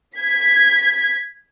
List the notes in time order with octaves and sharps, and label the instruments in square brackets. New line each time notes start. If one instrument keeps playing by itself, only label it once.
[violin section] G#6 B6